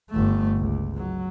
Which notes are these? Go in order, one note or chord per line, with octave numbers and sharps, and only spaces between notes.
G1 A3
C#2
F#3